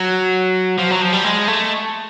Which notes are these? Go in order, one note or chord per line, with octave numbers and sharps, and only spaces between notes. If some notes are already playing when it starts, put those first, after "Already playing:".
Already playing: F#3
F3
F#3
F3
G3
G#3
A3